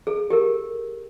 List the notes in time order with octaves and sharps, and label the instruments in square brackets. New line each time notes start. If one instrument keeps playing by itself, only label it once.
[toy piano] G#4 A4
G4 A4 A#4